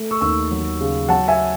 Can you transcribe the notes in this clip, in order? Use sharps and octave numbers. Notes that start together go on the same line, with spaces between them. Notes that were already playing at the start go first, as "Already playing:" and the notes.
Already playing: A3
C#6 E6
D#2 C#6 E6
F#3
C#3
F#3 F#5 A5
E5 G#5